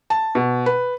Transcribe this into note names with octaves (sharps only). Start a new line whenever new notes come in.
A5
B2
B4